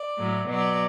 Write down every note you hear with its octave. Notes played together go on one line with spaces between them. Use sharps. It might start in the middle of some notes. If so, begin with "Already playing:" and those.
Already playing: D5
A2 F#3
B2 F#3 D5